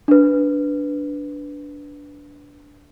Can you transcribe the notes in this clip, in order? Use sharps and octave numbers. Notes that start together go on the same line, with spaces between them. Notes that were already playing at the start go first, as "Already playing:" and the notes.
D4 B4